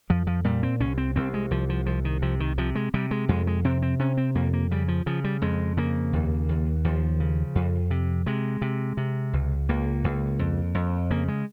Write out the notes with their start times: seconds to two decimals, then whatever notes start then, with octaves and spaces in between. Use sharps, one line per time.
0.10 F2 F3
0.27 F3
0.44 A#2 G3
0.63 C4
0.80 C2 C#4
0.98 C4
1.16 C2 C4
1.34 G#3
1.51 C2 F3
1.69 F3
1.86 C2 F3
2.05 D#3
2.22 C3 F3
2.40 D#3
2.58 C3 F3
2.75 G#3
2.94 C3 G3
3.11 G#3
3.29 F2 G#3
3.47 G#3
3.64 C3 C4
3.82 C4
3.99 C3 C#4
4.17 C4
4.35 F2 A#3
4.53 A#3
4.71 C#3 G3
4.88 F3
5.06 C#3 F3
5.24 G3
5.42 F2 G#3
5.77 C#3 A#3
6.13 D#2
6.49 D#2
6.84 D#2 F3
7.20 C#3
7.55 F2
7.91 C3
8.26 C3 G#3
8.62 C3
8.97 C3
9.33 C#2
9.69 C#2 A#3
10.04 C#2
10.39 F2
10.75 F2
11.11 C#3 A#3
11.28 G#3